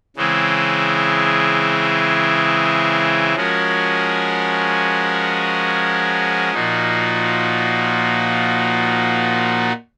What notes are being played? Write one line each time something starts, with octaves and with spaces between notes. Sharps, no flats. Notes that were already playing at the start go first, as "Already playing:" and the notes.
C#3 E3 G#3 C4 E4
F3 G#3 C#4 F#4 A#4
A#2 F3 A#3 D#4 F#4